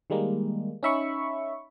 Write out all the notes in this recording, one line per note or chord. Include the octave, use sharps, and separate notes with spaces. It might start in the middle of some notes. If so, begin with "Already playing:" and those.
D#3 G3 G#3 A#3
C#4 D#4 E5 B5 C#6